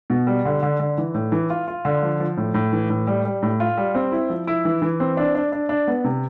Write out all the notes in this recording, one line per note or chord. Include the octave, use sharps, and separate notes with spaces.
B2
G3
D3
D3
D3
E3
A2
E3
F4
F4
D3
F3
F3
A2
A2
E3
A2
G3
G3
A2
F4
G3
C4
E4
F3
E4
E3
E3
C4
D4
D4
D4
D4
B3
C3